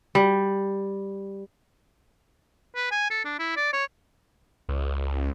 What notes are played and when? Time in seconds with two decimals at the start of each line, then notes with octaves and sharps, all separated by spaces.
0.15 G3
2.76 B4
2.92 G#5
3.11 A4
3.25 D4
3.39 E4
3.57 D5
3.73 C#5
4.69 C#2